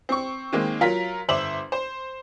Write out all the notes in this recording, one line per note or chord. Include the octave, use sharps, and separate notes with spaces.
C4 C#6
D#3 G#3 A#3 C4
F#3 F4 A#4 A#5 B6
G1 C5 E5 D6 F#7
C5